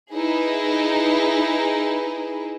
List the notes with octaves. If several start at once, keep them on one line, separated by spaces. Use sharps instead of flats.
D#4 E4 G#4 B4